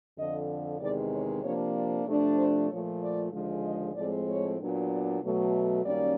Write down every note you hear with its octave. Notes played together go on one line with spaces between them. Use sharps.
F2 D3 F3 D#5
E2 C3 D#3 G#3 D5
C#5
C3 F3 A#3 D4 C#5
D5
C3 F3 A3 D4
C5
A#2 F3 A3 C#5
D5
D#2 D3 F3 G#3
D#5
A2 F3 G#3 C4 D5
C#5
A#2 F#3 B3 D4
D5
B2 F#3 A3
F#2 D#3 G3 A#3 C#4 D5